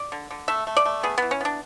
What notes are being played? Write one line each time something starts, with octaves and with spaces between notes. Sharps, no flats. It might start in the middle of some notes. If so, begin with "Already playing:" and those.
Already playing: D5
D3
D3
A3 E5
A3
D5
A3
B3 G#4
E3 B3
C#4
B3 D4